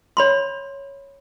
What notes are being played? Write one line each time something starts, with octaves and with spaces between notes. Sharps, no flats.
C#5 B5 C6